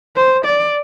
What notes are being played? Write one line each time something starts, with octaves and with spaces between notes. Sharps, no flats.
C5
D5